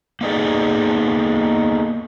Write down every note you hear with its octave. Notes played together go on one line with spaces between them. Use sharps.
A#3 B3 D#4 G#4 A4 D5